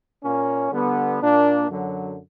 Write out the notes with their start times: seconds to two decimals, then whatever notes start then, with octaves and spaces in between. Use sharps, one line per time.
0.23 A#2 A#3 C#4
0.72 D3 G3 B3
1.21 A#2 A#3 D4
1.69 F#2 D3 F#3